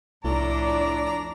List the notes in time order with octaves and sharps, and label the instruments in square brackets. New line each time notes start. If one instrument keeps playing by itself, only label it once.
[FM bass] C2 [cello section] F2 D4 D5 [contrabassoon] A2 [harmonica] A4 A#5